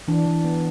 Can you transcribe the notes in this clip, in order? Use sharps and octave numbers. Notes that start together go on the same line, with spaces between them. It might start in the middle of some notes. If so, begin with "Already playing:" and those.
E3 D4
E3
B3